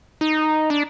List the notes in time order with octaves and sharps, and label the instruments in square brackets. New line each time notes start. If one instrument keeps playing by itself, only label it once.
[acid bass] D#4
D4